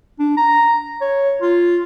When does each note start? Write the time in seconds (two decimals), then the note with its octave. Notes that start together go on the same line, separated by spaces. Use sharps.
0.19 D4
0.37 A#5
1.01 C#5
1.41 F4